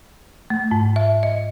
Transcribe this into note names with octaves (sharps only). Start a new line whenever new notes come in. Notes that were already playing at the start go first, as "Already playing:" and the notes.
A3
G#2
E5
D#5